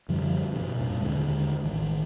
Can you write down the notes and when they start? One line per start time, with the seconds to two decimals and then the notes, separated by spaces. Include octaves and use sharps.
0.09 F#2 D3 F3 G3
0.52 G2 B2
0.77 F2 A#2
1.01 D#2 D3 G#3
1.64 A1 D#3